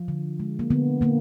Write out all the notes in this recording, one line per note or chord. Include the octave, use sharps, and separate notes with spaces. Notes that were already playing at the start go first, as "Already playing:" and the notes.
Already playing: F3 F4
D3
G#3
A#3
D3 B3
D3 A#3